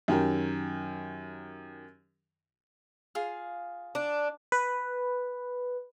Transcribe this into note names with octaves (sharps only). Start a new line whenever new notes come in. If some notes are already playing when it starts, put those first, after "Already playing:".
F#2 D#3 G4 A#4
F4 G#4 F5
D4
B4